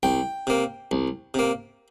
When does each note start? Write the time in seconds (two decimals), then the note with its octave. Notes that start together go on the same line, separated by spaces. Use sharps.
0.03 C2 G5
0.47 C3 A#3
0.91 C2
1.34 C3 A#3